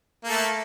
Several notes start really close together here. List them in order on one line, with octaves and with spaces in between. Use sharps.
A#3 A4 A3